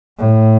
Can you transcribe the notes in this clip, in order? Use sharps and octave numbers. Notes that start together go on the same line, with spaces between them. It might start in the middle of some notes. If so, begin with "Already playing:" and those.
A2